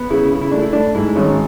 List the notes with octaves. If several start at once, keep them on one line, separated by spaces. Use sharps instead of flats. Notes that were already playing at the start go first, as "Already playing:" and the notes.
Already playing: B3
C#3 E4
C#3
E4
A3 D4
E4
A3 D4
G#2 E4
G#1 C#4